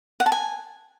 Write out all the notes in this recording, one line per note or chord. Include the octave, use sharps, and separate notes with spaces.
F#5
A5
G#5